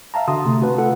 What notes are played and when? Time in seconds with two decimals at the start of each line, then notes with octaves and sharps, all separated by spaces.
0.14 E5 F5 A5 A#5
0.28 D3 F#4 A5 C6 D#6
0.45 C3 A3
0.62 F#4 B4
0.78 F4 A4 F#5